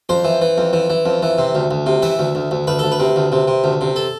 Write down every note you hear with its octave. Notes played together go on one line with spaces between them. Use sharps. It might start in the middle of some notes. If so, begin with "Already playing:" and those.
F2 C5
E3
E3
F2
E3
E3
F2
E3
C3
D2
D2
C3
E3 E5
D2
D2
D2
D2 B4
D2 A4
B4
C3
D2
C3
C3
D2
C3
A4